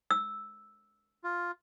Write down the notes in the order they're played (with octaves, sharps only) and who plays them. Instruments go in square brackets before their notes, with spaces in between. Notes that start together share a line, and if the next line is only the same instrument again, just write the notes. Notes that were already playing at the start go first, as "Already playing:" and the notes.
[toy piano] E6
[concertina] F4